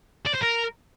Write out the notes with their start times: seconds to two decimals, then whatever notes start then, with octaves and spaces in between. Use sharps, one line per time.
0.27 D5
0.35 C5
0.43 A#4